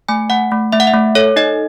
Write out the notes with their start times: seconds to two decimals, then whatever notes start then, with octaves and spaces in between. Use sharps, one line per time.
0.09 A3 G#5
0.30 A3 F#5
0.52 A3
0.73 A3 E5
0.80 F#5
0.87 E5
0.94 A3
1.15 A4 C#5
1.36 D#4 D#5